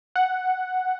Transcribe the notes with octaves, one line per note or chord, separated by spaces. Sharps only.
F#5